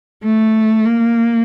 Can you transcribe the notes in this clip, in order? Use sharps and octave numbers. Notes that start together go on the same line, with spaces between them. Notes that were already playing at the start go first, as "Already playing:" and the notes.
A3
A#3